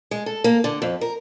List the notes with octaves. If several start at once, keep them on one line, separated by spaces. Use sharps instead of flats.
G#3
A4
A#3
D3
F2
A#4